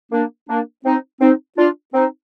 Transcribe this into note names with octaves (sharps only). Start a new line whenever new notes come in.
A#3 D4
A#3 D4
C4 D#4
C4 D#4
D4 F4
C4 D#4